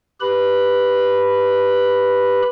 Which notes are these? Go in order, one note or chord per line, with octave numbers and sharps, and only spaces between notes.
G4 B4 B5